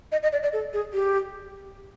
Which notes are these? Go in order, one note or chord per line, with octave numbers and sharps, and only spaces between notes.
D#5
D#5
D5
D5
A4
G#4
G4